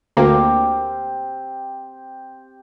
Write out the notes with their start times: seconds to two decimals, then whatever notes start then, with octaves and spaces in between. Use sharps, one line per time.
0.17 D2 A#3 C4 G4 F5